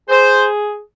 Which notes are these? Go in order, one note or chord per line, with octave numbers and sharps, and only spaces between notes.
G#4 C5